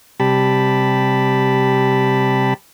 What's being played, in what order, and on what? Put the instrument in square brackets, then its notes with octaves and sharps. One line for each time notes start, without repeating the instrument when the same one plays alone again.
[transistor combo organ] C3 G3 G4 A5 B5